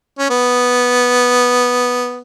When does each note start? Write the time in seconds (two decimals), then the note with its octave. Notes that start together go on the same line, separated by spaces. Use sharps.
0.19 C#4
0.30 B3